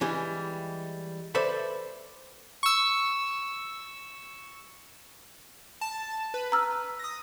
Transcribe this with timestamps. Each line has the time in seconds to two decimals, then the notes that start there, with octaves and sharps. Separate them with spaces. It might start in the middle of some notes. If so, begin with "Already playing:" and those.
0.01 E3 G3 G#3 G4
1.35 A4 B4 C5 D5 E5 B5
2.63 C#6 E6
5.81 A5
6.34 B4
6.52 A#5 E6 F6
6.99 D#6 A#6